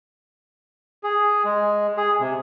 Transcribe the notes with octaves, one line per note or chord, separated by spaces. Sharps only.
G#4
G#3
G#4
C3